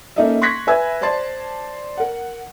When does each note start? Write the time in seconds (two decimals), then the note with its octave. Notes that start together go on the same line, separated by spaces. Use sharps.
0.16 A#3 C#4 D#4 A4 D#5 E5
0.42 C6 C#6 F#6 G#6 A#6 B6
0.67 B4 E5 G#5 E6 G#6
1.01 C5 D5 A5 C6 A6
1.97 A#4 F#5